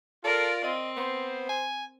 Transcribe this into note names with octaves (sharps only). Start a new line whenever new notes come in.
F4 A4 A#4 D5
C4 D#5
B3 C5
G#5